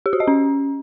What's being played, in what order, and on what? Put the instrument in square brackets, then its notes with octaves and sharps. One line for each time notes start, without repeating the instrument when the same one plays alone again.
[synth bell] G4
F#4
D#5
C#4